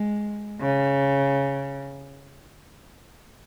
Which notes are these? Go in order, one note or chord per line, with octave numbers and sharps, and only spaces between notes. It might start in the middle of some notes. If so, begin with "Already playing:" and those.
Already playing: G#3
C#3